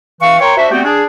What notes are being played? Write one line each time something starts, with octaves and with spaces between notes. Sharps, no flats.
E3 F5 C#6
A#4 C#5 G5 C6 C#6
D4 F#4 C5 E5
G3 A3 B3 C4 F#4 G4
D4 G#4